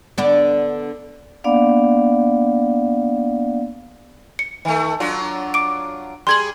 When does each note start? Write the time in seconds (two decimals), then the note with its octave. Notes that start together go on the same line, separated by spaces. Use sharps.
0.18 D3 B3 D4
1.44 A#3 B3 D4 D5 F5 F#5
4.39 C#7
4.65 D#3 A3
5.00 F#3 D4 F4
5.54 D6 D7
6.27 G3 G#4 C6 G#6 F#7